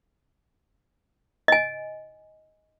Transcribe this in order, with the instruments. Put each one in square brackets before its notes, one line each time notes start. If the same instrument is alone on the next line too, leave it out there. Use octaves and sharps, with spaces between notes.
[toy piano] D#5 G#5